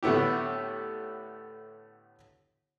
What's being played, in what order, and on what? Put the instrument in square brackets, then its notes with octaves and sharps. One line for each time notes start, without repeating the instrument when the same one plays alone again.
[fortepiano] A2 D3 B3 E4 G4